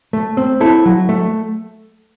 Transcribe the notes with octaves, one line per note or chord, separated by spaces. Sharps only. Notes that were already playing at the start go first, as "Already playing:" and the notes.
A3
C4
E4 A4
F#3
A3